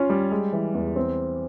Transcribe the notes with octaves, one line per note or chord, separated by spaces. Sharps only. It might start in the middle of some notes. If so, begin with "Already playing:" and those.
Already playing: C#4 F4
G3
G#3
E3
E2
C4